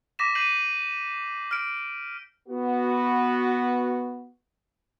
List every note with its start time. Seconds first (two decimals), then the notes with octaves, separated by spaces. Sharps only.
0.19 D6 A#6 B6 E7
0.35 G6 C7 D#7 F#7
1.51 F6 D7
2.49 B3 F#4